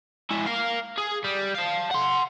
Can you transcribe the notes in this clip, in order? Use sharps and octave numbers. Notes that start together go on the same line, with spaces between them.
G#3 E4
A#4 F5
G#4
G3
F5 A5
F#5 C6